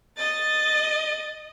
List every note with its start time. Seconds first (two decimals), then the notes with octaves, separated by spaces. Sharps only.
0.17 D#5 A6